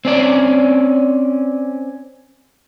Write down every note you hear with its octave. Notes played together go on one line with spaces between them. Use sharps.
C4 C#4 D5